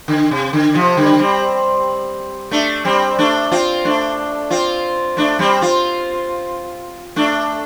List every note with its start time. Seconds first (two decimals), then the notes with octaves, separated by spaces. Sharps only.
0.08 D3
0.31 C3
0.53 D3
0.74 C3 F3
0.97 D3 G3
1.19 G3 C4
2.51 A3 D4
2.85 G3 C4
3.18 A3 D4
3.52 C4 F4
3.85 A3 D4
4.50 C4 F4
5.17 A3 D4
5.39 G3 C4
5.61 C4 F4
7.16 A3 D4